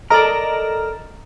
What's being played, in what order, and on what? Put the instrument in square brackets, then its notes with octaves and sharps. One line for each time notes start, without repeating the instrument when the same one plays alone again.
[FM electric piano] A4 D#5 A#5 [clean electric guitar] A#4 D5